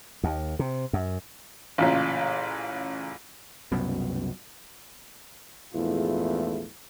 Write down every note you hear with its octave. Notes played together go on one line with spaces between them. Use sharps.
D#2
C3
F#2
A1 A#2 C#3
C2 F#2 B2
A#1 E2 G#2 A3 E4 F4